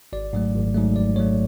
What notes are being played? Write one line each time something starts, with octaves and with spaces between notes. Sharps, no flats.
G#1 D5
G#2 F#3 A3
G#1
G#2 F#3 A3
G#1 D5
G#2 F#3 A3 C#5